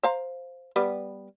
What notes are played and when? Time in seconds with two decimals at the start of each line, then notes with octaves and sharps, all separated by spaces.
0.03 C5 F5 A#5
0.76 G3 B3 B4